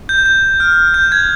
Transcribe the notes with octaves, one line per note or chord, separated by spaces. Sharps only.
G6
G6
F6
G6
G#6